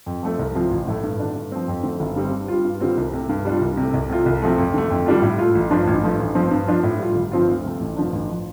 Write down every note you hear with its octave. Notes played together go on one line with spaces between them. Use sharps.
F2
F3 A3 C4
C2
C3 F3 C4 F4
A1
A2 A3
G2
D3 A3 D4
G2
F3 C4
F2
D3 A3 C4
G1
G2 G3 C4
G2
G3 F4
G2
D3 G3 C4 F4
C2
C3 A3
G2
G3 D4 F4
C2
C3 A3
C2
C3 A3 F4
C2
C3 F3 A3
F2
D3 A3
F2
D3 G3 D4 F4
A2
A3 F4
A1
G2 F3 D4 F4
A1
G2 F3 A3
A1
G2 F3 C4
G2
F3 D4 F4
A2
G3 F4
G1
G2 F3 C4 F4
D2
C3 A3
A1
G2 D3 F3 D4
A1
F3